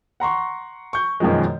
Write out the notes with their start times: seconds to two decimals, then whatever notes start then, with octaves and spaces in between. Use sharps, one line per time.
0.20 F#5 A#5 C6 C#6
0.93 C#6 G6
1.20 F#2 B2 D#3 F3 G#3